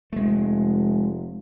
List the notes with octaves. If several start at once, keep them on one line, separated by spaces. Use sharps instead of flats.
F1 G#3 A3